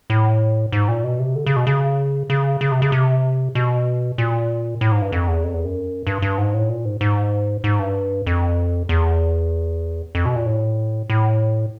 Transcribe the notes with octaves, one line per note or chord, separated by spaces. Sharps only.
A2
G#2
A#2
B2
C3
D3
C#3
B2
C#3
C#3
C#3
C3
C#3
C3
B2
A#2
A2
G#2
G2
F2
E2
F2
E2
F#2
G2
G2
G#2
A2
A#2
G#2
G#2
G#2
G2
F2
E2
F2
B2
A#2
A2
A2